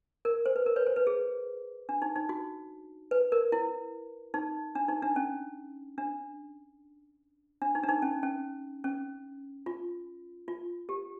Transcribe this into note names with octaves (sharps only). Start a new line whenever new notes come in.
A#4
C5
B4
A#4
B4 C#5
C5
B4
G#4
D4
D#4
D#4
F#4
B4
A#4
E4
D#4
D4
D#4
D4
C#4
D4
D4
D#4
D4
D#4
C#4
C#4
C#4
F4
F4
G4